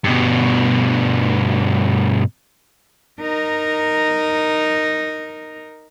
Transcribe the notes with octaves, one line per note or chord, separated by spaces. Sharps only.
G2 B2
D#4 A#4